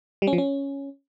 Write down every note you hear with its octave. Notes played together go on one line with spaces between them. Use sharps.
G3
C#4
F3
C#4